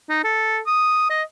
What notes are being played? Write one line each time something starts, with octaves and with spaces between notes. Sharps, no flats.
D#4
A4
D#6
D#5